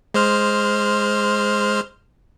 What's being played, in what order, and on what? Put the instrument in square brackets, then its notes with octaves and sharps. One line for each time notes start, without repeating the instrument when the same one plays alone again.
[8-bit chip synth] G#3 C5 F6